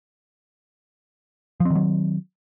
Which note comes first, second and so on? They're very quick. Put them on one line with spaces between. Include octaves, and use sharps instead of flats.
F3 C4 D#3 F#3